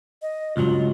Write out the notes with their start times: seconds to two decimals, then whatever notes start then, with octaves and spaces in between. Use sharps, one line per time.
0.22 D#5
0.57 C#2 G2 F#3 F4